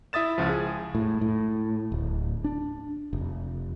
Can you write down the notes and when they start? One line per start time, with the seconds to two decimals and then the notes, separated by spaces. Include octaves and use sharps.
0.13 E4 E5 D#6 A6 E7
0.38 C#2 F3
0.49 G#4
0.95 A2
1.21 A2
1.92 D1
2.44 D4
3.13 F1